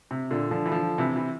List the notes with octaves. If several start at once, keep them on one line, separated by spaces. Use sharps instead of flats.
C3
A#2 D3
D3 F3
E3
D3 F3
C3 E3
E3